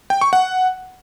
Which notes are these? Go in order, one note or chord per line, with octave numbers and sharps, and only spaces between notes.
G5
C#6
F#5